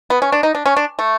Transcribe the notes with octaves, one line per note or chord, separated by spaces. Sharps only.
B3
C#4
D4
D#4
D4
C#4
D4
A3